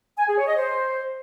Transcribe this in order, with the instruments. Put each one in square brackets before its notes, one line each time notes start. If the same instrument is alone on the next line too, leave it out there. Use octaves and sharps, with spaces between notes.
[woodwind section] G#5
G#4
C#5
D#5
C5